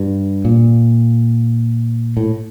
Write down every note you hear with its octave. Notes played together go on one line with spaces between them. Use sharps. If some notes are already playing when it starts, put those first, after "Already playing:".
Already playing: G2
A#2
A2